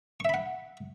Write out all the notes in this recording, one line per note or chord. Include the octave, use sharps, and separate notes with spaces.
E5 F#5 B5 C#6